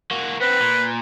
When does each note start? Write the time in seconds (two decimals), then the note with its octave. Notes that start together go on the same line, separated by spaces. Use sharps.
0.11 A#3 F#4
0.41 B3 C4 B4
0.61 A#2